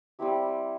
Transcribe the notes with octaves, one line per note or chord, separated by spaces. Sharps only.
G3 C4 E4 G4